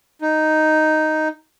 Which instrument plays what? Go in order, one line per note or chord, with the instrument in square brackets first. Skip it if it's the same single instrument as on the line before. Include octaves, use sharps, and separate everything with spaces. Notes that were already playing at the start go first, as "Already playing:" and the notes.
[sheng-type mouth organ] D#4